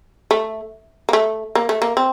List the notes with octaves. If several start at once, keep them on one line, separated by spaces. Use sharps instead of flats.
A3
A#3
A3
A#3
A3
A#3
C4